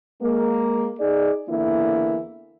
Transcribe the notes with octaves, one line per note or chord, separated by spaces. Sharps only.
G#3 A#3
D#4 G#4 D5
E2 D3 E3 A#3 E4